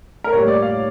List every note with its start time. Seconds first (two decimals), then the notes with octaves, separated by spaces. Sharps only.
0.24 A#4
0.32 A2 G3 A#3 C#5
0.48 D5
0.62 F5